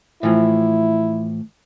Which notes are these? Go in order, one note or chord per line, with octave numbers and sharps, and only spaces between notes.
A2 E3 F3 E4